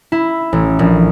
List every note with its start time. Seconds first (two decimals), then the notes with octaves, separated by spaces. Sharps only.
0.12 E4
0.53 A1
0.79 A#1